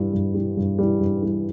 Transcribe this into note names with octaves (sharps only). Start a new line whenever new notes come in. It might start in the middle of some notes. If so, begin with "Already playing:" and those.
Already playing: G2 E3 G3
G2
E3 G3
G2
E3 G3
G2
E3 G3